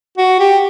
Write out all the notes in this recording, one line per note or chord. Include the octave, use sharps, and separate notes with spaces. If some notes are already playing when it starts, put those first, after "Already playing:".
F#4
G4